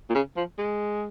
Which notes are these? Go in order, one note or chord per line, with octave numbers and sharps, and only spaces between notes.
A#2
C#3
F3
G#3